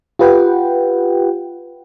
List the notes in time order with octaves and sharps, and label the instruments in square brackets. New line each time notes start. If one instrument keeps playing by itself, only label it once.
[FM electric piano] F4 G4 B4 F#5 G5